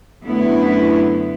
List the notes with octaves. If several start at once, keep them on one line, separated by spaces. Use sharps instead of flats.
F#2 D3 A3 B3 E4